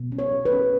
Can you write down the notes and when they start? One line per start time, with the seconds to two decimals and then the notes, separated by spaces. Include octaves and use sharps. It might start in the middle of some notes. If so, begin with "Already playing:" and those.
Already playing: B2
0.12 C#4
0.19 C#5
0.32 B2
0.45 B4
0.52 C#4